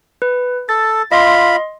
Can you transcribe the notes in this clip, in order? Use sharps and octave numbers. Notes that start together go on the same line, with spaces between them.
B4
A4 A6
F4 D#5 B5 C6